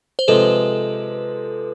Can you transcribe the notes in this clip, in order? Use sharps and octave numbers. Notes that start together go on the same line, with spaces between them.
C5
C3 F3 G#3 A4 B4